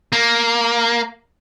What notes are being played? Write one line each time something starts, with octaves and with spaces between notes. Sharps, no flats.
A#3